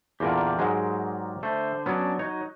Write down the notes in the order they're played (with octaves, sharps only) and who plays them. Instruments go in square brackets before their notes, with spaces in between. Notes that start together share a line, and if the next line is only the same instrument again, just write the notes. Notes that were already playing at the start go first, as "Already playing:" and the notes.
[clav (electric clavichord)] E2 A#2 D3 [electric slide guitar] G4 A#4 D5
[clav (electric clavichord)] G#2 F#3 G#3
[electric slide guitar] D3 C5 [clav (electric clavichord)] A3
[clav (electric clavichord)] F#3 B3 [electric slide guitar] C#4 D4
[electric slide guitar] F#3 D#4 [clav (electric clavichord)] C#5